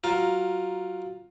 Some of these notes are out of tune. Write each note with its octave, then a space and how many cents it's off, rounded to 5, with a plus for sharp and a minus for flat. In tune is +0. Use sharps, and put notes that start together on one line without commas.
F#3 +20 F4 +15 A#4 +0